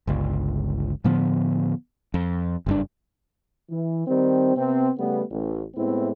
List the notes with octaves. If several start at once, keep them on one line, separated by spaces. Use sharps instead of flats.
G1 C#2
A2 D3 F3 B3
F2
F#1 G2 D4
E3
D#3 G3 C4
C3 B3 C4
C#3 G3 A3 B3
A1
A2 G#3 B3 C4 E4